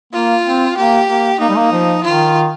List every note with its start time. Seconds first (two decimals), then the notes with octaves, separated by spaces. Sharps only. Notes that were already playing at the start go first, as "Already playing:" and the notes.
0.13 A#3 F4
0.45 C4
0.77 A#3 G4
1.08 A#3
1.40 A#3 D#4
1.49 G3
1.57 A#3
1.72 F3
2.04 D#3 F4